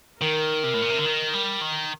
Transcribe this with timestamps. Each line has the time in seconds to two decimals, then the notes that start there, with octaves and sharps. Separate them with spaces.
0.21 D#3 A#4
0.64 C3
0.74 A2
0.82 A#2
0.90 C3
0.98 D3
1.05 D#3
1.34 G3
1.61 D#3